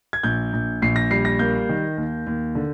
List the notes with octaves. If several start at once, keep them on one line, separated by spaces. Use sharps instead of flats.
G#6
A#1 G6
A#1
A#1 C7
A#6
G3 C7
A#6
A#3 G6
D#3
D#2
D#2
D3